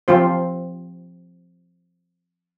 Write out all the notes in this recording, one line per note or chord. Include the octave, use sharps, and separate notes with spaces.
F3 C4 F4 C5